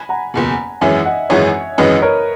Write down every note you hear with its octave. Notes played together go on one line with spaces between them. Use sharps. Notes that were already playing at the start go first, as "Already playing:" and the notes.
Already playing: G#5 B5
F#5 A#5
F#1 E2 B2
G#1 F#2 E3 G#3 C#4 E5 G#5
D#5 F#5
G#1 F#2 E3 G#3 C#4 C#5 E5
G#1 F#2 E3 G#3 C#4 B4 D#5
A#4 C#5